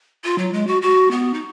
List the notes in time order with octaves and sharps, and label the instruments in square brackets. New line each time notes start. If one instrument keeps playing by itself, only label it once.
[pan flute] F4
F#3
G#3
F#4
F#4
B3
D#4